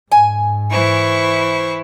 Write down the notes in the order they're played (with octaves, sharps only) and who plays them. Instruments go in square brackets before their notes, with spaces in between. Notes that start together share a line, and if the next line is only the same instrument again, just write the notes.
[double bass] G#2 [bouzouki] G#5
[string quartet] E3 E4 [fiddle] C5 C#6